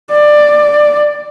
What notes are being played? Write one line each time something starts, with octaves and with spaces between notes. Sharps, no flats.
D5